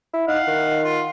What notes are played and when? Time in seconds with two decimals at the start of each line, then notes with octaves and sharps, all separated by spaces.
0.14 E4
0.28 D#4 F5 F#5
0.48 D#3
0.84 F4